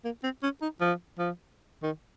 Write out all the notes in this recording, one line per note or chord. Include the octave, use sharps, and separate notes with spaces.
A#3
C4
C#4
D#4
F3
F3
D#3